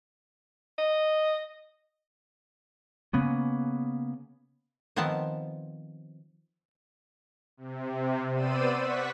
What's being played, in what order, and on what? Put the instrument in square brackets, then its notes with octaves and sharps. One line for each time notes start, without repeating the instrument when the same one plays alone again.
[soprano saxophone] D#5
[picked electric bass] C#3 A#3 B3 C#4
[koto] D#3 F3 B3 C4 A5
[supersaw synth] C3
B3 C5 D5 E6 D#7
F#5 C#6 B6